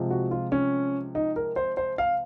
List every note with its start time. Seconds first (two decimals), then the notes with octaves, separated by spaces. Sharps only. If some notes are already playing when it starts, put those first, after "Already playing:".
Already playing: C3 F3 G#3
0.10 F#4
0.31 F4
0.52 C#4
1.15 D#4
1.36 A#4
1.56 C5
1.77 C5
1.98 F5